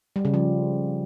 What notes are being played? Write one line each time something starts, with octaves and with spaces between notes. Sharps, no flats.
G3
C#3
F3